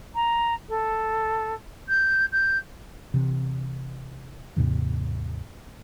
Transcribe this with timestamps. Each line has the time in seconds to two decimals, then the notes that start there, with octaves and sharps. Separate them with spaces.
0.15 A#5
0.68 A4
1.88 G6
2.32 G6
3.14 C3 E3
4.56 D#2 G#2 C3 E3